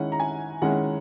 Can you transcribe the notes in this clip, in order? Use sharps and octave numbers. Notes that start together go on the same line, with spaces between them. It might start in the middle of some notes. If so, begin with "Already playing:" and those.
Already playing: D#3 G#3 C#4 E4 F#5
A#5
G#5
D#3 G#3 C#4 E4 F#5